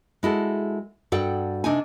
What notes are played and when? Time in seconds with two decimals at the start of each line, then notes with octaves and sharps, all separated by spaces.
0.23 G#3 E4 F#4 A4
1.12 G2 F#4 A4 D5 F#5 G5
1.64 C3 D4 D#4 G#5